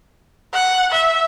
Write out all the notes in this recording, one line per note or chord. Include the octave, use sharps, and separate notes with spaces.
F#5
E5